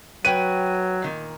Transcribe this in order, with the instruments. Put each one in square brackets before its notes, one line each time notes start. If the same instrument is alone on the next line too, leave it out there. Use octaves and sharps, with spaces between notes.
[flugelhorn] F#3 [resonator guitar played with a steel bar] B4 C#5 G5 [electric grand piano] D#7
[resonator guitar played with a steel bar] A#2 D#3